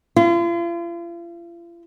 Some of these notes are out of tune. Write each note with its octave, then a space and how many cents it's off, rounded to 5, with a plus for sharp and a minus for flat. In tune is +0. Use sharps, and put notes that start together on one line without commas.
F4 -40